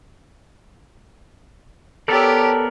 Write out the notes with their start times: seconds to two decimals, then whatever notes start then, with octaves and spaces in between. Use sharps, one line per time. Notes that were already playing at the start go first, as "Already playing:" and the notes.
2.08 B3 G4 A4 A#4 C#5 D5